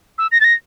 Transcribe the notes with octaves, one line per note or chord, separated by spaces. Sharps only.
E6
A#6
A6
A#6